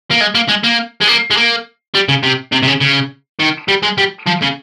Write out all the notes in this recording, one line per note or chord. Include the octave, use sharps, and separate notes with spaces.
A#3
G#3
A#3
G#3
A#3
G#3
A#3
G#3
A#3
G3
C#3
C3
C3
C3
C#3
C#3
D#3
G3
G#3
G3
F3
C#3